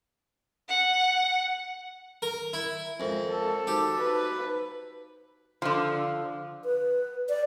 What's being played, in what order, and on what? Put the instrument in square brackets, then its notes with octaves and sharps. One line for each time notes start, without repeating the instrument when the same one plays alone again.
[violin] F#5
[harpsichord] A#4
E4
[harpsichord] F2 [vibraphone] G#3 A#4
[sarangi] A4
[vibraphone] D#4 F#4 C5 [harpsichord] G4
[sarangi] B4
[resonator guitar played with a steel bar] D3 F3
[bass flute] B4
D5